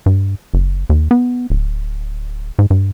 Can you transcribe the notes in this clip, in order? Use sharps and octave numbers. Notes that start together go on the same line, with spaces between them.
G2
F#1
D#2
B3
D1
G#2
G2